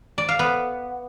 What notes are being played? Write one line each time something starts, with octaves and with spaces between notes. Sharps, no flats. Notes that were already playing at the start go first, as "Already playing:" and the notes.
D5
F5
B3